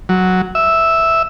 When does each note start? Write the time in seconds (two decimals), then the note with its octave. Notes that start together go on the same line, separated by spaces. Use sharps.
0.09 F#3
0.55 E5